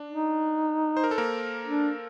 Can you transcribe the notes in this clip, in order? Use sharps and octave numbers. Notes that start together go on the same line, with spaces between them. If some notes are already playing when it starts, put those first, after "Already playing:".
Already playing: D4
D#4
C5
A#4
A4
A#3 A#4
D4